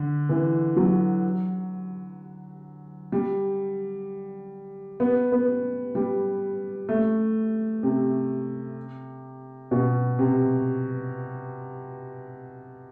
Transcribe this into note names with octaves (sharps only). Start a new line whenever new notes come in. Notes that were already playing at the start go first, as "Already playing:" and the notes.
Already playing: D3
E3
F#3
G3
B3
B3
G3
A3
C3
B2
C3